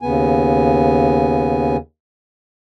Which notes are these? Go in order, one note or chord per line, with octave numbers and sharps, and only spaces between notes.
D#2 C#3 B3 G#5